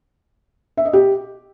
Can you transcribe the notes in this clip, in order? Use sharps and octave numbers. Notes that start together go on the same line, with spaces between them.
E5
D#5
G4